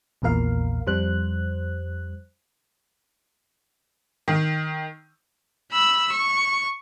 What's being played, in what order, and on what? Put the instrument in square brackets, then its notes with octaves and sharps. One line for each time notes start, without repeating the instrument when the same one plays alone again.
[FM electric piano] A#1 E2 A#2 A#4 F5
F2 G3 C5 F#6
[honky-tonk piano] D#3
[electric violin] B5 E6
C#6